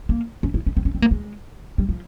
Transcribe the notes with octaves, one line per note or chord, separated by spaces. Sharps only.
A#3
C#4
E4
C#4
C4
C#4
C4
A#3
G#3
G3
F3